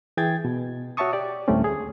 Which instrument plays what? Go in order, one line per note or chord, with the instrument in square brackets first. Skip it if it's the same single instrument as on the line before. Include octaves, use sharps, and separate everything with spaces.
[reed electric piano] E3 G#4 G5 G#6 A6
B2
F#4 C#5 E5 A5 C#6 D#6
G4 D5
D2 A2 G3 A3 C4 C#4
G#4